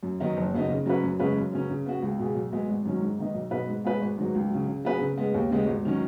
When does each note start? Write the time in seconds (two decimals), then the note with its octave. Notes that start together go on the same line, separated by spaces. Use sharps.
0.03 F#2
0.20 D#3 F#3 B3 D#4
0.37 F#1
0.53 F#2 C#3 B3 D#4
0.69 C#3
0.86 F#3 C#4 B4
1.03 F#2
1.19 C#3 G#3 C#4 B4
1.36 F#2
1.52 C#3 F#3 C#4
1.69 C#3
1.86 B3 F#4
2.02 C#2
2.19 B2 B3 G#4
2.35 B1
2.52 B2 G#3 B3 G#4
2.69 G#1
2.85 F#2 D#3 F#3 C#4
3.01 G#2
3.19 D#3 B3 D#4
3.34 B1
3.51 B2 B3 D#4 B4
3.68 G#2
3.84 G#3 B3 G#4 B4
4.01 G#1
4.18 G#2 D#3 F#3
4.35 C#2
4.50 C#3 F#3
4.67 C#3
4.84 F#3 B3 G#4 B4
5.00 C#3
5.18 G#3 B3
5.34 D#2
5.49 C#3 G#3 B3
5.66 G#1
5.85 D#3 F#3 C#4